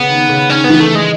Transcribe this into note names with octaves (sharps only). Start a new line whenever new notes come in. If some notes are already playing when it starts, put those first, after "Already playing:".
Already playing: C#3 B3
D#3
C#3
D#3 C#4
B3
E3
A3
G#3